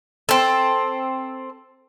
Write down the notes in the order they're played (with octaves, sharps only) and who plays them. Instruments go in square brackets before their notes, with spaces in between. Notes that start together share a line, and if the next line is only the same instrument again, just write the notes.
[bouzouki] C4 A4